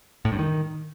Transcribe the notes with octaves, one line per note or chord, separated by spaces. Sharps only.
A2
G2
D#3